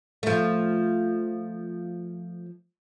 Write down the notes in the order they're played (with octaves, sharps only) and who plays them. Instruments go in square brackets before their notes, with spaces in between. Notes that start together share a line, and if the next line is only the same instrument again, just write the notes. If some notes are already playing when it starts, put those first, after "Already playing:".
[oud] F3 A3